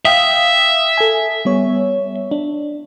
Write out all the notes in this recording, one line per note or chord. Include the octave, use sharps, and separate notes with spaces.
E5 F5 G5 D#6
A4 G#5
G3 B3 C#5
D4